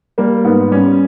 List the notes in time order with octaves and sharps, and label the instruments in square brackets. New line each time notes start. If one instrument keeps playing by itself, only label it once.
[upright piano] G3 A#3
G#2 B3
G3 C#4